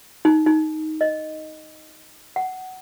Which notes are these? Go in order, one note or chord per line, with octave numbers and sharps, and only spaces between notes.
D#4
D#4
D#5
F#5